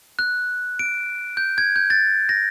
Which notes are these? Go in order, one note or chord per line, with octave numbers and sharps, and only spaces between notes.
F#6
D7
G6
G#6
G6
A6
A#6